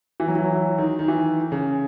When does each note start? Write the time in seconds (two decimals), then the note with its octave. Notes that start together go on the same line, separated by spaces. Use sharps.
0.20 E3
0.28 F#3
0.36 E3
0.44 F#3
0.53 E3
0.78 D#3
0.99 D#3
1.08 E3
1.52 C#3